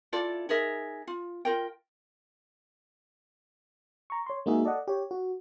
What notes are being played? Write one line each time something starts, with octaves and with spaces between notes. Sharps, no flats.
E4 F4 A4 D5
D#4 G#4 A#4 E5
F4
F4 A#4 G5
A#5 C#6
C#5 C6
G#3 A#3 D#4 F#4 G#4 E5
A4 D5 D#5 F#5
G4 C#5
F#4